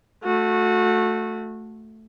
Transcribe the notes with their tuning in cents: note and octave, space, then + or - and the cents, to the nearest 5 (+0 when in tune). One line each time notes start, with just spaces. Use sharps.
A3 +0 F#4 -25